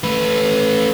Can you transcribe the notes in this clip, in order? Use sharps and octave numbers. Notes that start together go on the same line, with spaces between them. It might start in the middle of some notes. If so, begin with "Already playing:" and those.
A3 B4